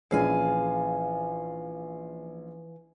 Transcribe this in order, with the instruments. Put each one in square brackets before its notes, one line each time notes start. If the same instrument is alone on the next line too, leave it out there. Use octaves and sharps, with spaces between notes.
[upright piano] A#1 C#4 G#4 [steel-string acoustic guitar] E3 F5 G#5